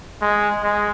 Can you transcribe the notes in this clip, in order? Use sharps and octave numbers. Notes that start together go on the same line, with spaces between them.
G#3
G#3